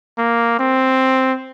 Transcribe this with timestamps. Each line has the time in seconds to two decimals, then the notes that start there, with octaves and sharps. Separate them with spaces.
0.18 A#3
0.59 C4